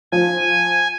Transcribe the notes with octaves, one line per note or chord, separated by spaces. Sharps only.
F3 G#5